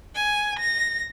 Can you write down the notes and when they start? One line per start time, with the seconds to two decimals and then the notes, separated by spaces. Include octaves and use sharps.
0.15 G#5
0.59 A#6